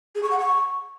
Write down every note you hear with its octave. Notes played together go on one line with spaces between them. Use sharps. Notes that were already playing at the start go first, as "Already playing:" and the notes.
G#4
C#6
F#5
C#6